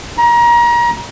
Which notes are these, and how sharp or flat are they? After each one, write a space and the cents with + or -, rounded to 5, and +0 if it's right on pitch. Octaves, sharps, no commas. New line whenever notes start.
A#5 +30